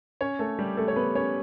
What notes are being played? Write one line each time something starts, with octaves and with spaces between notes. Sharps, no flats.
C#4 C#5
A3 A4
G3 G4
A3 A4
C#5
B3 B4
C#4 C#5